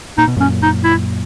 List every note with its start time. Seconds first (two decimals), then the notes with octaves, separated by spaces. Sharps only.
0.18 A#2 D#4
0.27 B2
0.37 F#2 A#2 C#4
0.62 D#4
0.84 E4